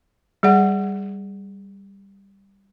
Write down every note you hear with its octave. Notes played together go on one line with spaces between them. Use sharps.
G3 G#4 D5 F#5